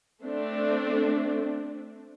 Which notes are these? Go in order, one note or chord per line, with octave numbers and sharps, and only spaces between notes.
A3 C4 D4